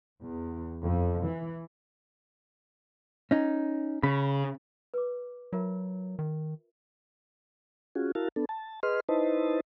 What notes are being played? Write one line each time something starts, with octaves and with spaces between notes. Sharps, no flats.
E2
F2
E3
C#4 D#4
C#3 B5
B4 D6
F#3 F4 A#4 E5
D#3
C#4 F4 F#4 G#4
E4 F#4 A#4 F5 A5
B3 D4 A4
A5
G#4 B4 D#5 C6 F6
D#4 E4 B4 C5 D#5 A5